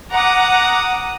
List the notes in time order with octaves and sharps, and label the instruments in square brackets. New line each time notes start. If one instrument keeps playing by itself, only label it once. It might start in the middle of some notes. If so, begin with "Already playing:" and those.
[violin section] F#5 A#5 D6 D#6